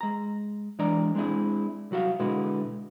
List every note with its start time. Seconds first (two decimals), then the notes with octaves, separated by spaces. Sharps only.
0.01 G#3 A#5
0.79 E3 G#3 D4 D5 D#5 A#5
1.15 G#3 C4 D4 E4 G#4
1.91 C2 F#3 F#4 E5 F5
2.20 B2 D3 G#3 B3 E4 F#4